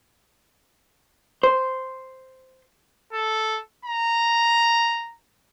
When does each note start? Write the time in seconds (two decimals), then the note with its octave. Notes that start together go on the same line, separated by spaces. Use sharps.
1.43 C5
3.13 A4
3.85 A#5